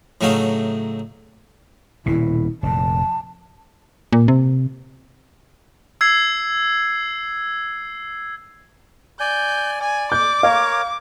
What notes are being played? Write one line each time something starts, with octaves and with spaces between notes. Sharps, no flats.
A2 C#3 F#3 A3 D#4 F5
D#1 B2 E4
F1 A#2 A5
A#2
C3
E6 G#6 C7
D5 G#5 G6
D5 G#5
D6 G6
A#4 C#5 F5